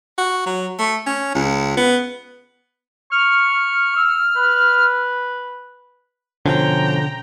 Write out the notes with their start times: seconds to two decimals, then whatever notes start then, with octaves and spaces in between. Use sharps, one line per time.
0.18 F#4
0.46 F#3
0.79 A3
1.06 C#4
1.35 C#2
1.77 B3
3.12 C#6 F6
3.96 E6
4.36 B4
6.46 B2 D3 F3 C#4 G5 A#5